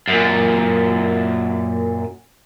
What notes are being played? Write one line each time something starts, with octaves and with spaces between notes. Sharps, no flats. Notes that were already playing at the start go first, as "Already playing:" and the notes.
F#2 A#2